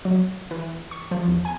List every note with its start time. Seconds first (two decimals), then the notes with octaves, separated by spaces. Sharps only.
0.05 F#3
0.51 E3
0.91 C#6
1.11 F3
1.28 E2
1.45 G#5